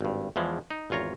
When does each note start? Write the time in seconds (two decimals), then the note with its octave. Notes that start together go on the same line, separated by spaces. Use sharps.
0.01 G#1 G2
0.36 E2 E3 F3 G#3
0.70 D#4
0.90 G#1 E2 F4 C#5 A#5